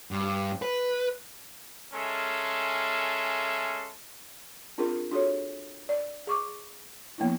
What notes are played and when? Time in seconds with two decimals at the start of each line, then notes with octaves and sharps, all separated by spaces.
0.11 G2
0.62 B4
1.93 G#3 C#4 A4 A#4 E5 C6
4.78 C4 D4 F4 G#4 A#4
5.11 D4 F#4 G#4 A4 C#5
5.89 D5
6.27 G#4 C#6 D6
7.18 F3 A#3 B3 D4 E4